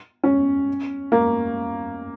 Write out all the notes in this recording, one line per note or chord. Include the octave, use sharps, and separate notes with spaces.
C#4
A#3